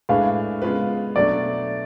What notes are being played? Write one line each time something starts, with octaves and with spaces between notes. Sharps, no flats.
A2 G#3 D4 G#4 B4 F5
C#3 G#3 B3 F4 B4
B2 F#3 A3 D4 D5